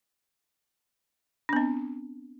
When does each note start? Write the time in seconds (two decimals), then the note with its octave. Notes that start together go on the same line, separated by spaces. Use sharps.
1.49 D4
1.53 B3
1.56 C4